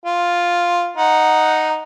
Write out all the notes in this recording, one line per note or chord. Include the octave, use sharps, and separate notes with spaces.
F4
D#4 F#5